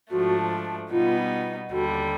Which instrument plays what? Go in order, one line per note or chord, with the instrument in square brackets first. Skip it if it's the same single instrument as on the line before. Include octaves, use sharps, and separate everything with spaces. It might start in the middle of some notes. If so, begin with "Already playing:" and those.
[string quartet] G#2 F3 A3 D4 [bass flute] F#4
[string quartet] B2 G3 B3 D#4 [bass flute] F4
[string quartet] D#2 D3 G3 [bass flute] F#4